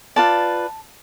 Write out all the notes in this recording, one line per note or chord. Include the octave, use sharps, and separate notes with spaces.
F4 B4 D5 A5